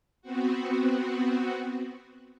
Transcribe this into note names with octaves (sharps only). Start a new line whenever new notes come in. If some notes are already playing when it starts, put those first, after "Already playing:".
B3 C4 F#4